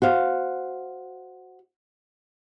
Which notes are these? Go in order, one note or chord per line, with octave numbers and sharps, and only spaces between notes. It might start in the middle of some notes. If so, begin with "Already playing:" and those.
F#4 C5 F5